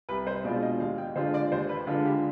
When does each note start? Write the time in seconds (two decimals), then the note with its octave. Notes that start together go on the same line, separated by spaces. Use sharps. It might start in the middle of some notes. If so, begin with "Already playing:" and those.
0.09 C2 B4
0.27 C5
0.44 B2 G#3 D4 F4 D5
0.62 D#5
0.80 D#2 F5
0.98 G5
1.15 D3 G#3 D4 F4 C5
1.34 D5
1.52 D#2 C5
1.69 B4
1.87 D3 G#3 D4 F4
2.05 G4